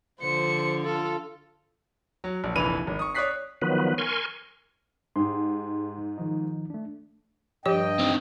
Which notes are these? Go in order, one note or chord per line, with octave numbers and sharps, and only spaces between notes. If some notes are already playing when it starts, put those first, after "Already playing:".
D3 F3 C5 C#7
F4 A4
F#3
A#1
F1 A#1 E3 B4 D#7 F7
G#1
C#6 D#6
C#5 D5 D#6 F#6 B6 C7
D#3 F3 F#3 B3 B4
A#4 G#5 C6 C#6
G#2 G4 G#4 C6
D#3 F3 D#4
A3 D4
G2 F3 G4 C#5 D#5 G5
C4 D#4